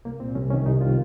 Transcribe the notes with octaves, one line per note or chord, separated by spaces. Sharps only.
C2 A#3
A#2 C4
C2 C#4
C3 D#3 C#4
C2 D#4
C3 D#3 F4